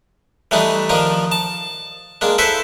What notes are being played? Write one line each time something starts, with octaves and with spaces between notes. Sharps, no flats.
E3 G3 A3 D4 D#4
D#3 F3 D4 D#4
A5
G#3 A#3 D4
E4 A4 B4 C5 E5